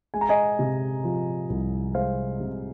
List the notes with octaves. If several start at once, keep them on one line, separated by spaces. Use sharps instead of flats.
G#3 G#5
A#5
D#5 G#5
C3
F3
C2
G#3 C5 F5
C3